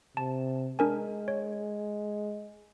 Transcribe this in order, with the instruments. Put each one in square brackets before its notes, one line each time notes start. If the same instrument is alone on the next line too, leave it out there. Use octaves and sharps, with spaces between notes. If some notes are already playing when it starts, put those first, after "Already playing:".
[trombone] C3 [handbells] A5
[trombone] G#3 [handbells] D4 A#4 G#5
[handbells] C#5